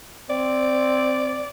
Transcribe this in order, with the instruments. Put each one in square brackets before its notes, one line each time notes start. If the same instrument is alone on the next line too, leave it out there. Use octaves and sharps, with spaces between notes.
[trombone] C4 [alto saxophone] D5